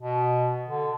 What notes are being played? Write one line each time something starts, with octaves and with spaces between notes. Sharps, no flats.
B2
D3